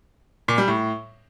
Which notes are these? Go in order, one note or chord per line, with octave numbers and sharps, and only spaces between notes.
A#2
G3
A2